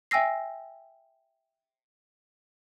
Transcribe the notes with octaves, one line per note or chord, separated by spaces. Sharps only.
E5 G5 G#5 E6 A#6 C7